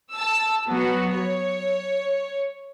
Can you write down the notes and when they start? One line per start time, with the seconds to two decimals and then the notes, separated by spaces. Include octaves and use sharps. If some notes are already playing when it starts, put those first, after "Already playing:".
0.12 A5 E6
0.68 F#3 B3 F#4
1.12 C#5